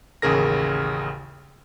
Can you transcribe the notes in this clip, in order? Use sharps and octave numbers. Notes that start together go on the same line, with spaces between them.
A1 D#2 C#3 G#4 A#4 A#6